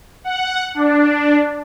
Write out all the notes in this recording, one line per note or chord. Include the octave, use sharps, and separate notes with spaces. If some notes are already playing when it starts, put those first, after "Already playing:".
F#5
D4